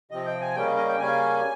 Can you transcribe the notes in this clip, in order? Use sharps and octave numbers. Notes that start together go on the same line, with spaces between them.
C3 F3 C4 D#5
G5
G#5
C#3 G3 A#3 C#4 G5
D#5
D#5
G5
C#3 G3 A#3 C#4 G#5